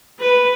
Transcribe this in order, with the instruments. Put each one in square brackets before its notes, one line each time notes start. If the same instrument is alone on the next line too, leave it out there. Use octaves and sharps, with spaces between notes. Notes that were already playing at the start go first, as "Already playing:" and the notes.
[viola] B4